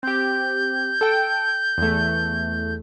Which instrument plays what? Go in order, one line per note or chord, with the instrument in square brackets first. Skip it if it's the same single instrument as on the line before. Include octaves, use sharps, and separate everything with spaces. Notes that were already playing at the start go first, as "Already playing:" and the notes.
[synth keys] C4 G4 [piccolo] G6
[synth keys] A4 G5
E2 A3